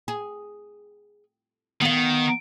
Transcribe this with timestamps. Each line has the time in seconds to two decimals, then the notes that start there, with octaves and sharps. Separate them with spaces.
0.08 G#4
1.81 D#3 B3 F5